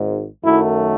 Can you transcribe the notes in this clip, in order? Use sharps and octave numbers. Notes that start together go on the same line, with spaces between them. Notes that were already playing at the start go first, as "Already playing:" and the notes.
Already playing: G#1 G#2
F#2 D#3 F#3 A3 E4